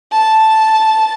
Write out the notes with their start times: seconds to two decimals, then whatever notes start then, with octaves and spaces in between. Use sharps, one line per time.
0.12 A5